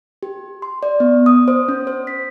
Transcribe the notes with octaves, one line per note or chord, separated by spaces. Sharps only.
G4
C6
D5
B3
D#6
C5
C#4
C5
B6